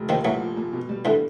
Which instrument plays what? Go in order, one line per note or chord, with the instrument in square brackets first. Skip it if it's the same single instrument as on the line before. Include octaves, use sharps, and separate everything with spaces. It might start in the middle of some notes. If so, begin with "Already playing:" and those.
Already playing: [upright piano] F1
[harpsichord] D#3 F3 [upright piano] A#3
[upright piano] A#2 [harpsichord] E3 F#3
[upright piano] F3
A#2
B2
G3
[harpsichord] D3 E3